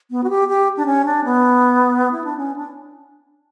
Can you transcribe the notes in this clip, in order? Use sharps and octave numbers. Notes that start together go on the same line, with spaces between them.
B3
F#4
G4
G4
D4
C#4
D4
B3
E4
D4
C#4
D4